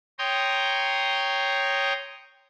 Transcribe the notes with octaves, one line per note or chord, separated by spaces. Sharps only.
C#5 G5 A#5 C6 D#6